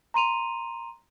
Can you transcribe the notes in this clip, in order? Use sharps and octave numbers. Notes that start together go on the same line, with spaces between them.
A#5 C6 D#7 F7